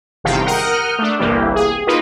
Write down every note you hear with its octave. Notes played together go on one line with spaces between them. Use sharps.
G1 E2 C3 D#3 F5 G5
A#4 F#5 D#6 F6 G6
A3 D4
G1 C2 E3 A#3 G4
G#4
A#3 D#4 F4 B4